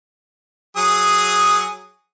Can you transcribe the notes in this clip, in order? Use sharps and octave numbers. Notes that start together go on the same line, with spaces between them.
F#3 G#4 D#6